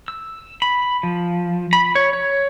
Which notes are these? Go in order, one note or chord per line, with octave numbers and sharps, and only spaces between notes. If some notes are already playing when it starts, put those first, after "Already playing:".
E6
B5
F3
B5
C#5
C#5